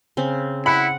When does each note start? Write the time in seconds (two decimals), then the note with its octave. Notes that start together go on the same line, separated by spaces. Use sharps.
0.17 C#3 C4
0.66 E4 F#5 B5